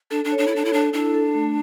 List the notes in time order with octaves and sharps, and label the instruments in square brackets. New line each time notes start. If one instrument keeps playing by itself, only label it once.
[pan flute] D4 [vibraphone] A4
[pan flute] D4
[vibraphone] C#5
[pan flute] D4
E4
[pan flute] D4 [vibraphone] A4
[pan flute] E4
[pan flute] D4 [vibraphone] A4
[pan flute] D4 [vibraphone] E4
[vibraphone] A4
A3